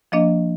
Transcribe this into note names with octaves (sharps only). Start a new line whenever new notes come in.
F3 A#3 D4 D#5